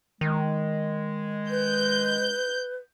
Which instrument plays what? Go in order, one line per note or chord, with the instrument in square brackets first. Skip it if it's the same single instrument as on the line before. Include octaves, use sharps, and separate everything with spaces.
[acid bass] D#3 [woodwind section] G#3
[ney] B4 [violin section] G6